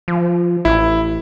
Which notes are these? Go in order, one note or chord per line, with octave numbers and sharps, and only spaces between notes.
F3
A1 E4